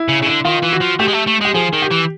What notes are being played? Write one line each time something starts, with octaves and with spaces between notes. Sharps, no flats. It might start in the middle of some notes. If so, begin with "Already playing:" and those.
Already playing: E4
C#3
C#3
D3
D#3 F4
E3
F#4
F3
A3 G4
G#3
A3
A3
G#3 G4
F3 G#4
D#3
G4
E3